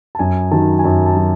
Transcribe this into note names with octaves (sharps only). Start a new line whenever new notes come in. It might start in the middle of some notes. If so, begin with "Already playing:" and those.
A5
F#2 G#5
D#3 F#3 A5
G#5
F#2 A5
A5
F#3